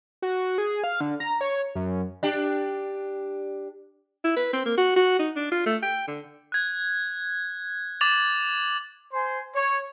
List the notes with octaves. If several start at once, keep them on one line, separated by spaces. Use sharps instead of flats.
F#4
G#4
F5
D3
A#5
C#5
F#2
D4 G4
E4
B4
C4
A#3
F#4
F#4
D#4
D4
F4
A3
G5
D3
F#6 G#6
D6 A6 F7 F#7
C5 G#5 C6
C#5